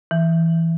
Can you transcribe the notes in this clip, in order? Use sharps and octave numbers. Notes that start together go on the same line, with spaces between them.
E3